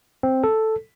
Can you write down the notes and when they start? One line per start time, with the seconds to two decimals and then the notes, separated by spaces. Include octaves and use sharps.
0.23 C4
0.44 A4